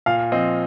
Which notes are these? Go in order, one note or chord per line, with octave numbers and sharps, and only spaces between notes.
A#2 F5
F3 C4 D#5